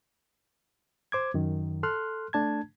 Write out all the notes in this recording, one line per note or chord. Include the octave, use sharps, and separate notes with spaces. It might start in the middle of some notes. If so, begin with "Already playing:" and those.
C5 D6 G#6
F#2 D#3
A4 C6 F6 F#6
A3 D4 A5 G#6